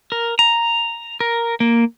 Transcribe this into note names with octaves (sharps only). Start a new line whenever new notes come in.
A#4
A#5
A#4
A#3